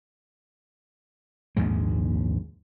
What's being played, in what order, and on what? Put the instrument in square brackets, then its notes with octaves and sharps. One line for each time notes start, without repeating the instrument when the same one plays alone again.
[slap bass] A#1 D#2 G#2 G#3